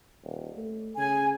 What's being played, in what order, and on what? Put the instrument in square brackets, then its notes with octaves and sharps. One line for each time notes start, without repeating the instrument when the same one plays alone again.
[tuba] D#1
A3
[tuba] C#3 [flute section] G#5